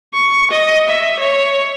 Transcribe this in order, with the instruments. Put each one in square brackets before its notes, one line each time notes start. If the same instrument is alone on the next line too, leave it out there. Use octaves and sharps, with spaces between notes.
[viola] C#6
D#5
E5
C#5